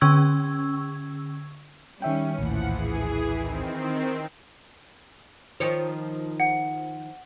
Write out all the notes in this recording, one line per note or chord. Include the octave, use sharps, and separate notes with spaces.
D3 C#4 C#6 E6 G#6
D#3 G3 C#4 E5 G5
A#1 D#2 A2 E3 F3 F#5 C#7
G#4
D#3 C4
D#3 F3 C#5
F#5